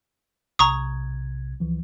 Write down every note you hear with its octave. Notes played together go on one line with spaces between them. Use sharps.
B1 C3 A#5 C#6 D#6 G#6
C#2 E3 F3